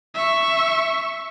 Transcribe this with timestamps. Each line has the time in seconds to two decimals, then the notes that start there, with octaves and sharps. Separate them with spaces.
0.15 E5 C#6